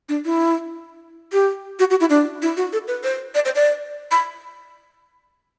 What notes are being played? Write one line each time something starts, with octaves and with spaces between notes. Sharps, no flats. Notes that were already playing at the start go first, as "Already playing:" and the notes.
D4
E4
G4
F#4
F#4
E4
D4
E4
F#4
A4
B4
C5
D5
C5
D5
B5